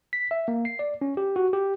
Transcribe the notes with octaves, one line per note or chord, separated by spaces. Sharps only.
B6
E5
A#3
C7
D5
C#4
G4
F#4
G4